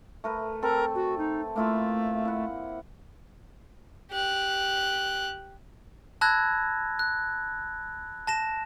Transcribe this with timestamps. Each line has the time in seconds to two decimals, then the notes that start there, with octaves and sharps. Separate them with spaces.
0.24 A3 A#4 B4
0.63 C4 A4 A#4
0.95 F#4
1.18 D#4
1.56 A3 A#3 E4 F4
2.25 E4 F#5
4.11 G4 F#6
6.21 A5 B5 E6 F#6 G#6 A#6
6.99 F#6
8.27 A5 A#6 E7